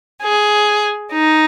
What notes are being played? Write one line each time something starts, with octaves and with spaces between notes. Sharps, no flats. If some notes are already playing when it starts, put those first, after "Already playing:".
G#4
D#4